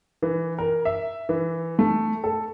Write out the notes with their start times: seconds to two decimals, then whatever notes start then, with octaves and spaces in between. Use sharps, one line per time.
0.22 E3
0.58 A#4
0.85 E5
1.29 E3
1.79 A3
2.24 A4